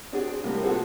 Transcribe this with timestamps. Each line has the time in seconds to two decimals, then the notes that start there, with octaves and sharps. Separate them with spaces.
0.12 C4 D4 F#4 G#4 D5
0.44 A2 C3 G3 A#3
0.63 F3 C4 F#4 G#4 A4 C5